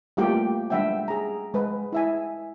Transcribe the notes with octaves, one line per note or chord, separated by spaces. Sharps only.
G3 A3 A#3 F4 G4 G5
G3 G#3 D4 E5 F#5 G5
G#4 A#5
G#3 B4
E4 E5 G#5